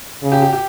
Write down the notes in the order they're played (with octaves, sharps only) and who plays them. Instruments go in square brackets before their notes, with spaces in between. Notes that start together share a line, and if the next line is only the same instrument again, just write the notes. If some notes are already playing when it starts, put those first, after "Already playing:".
[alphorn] C#3
[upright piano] G4
G4
G4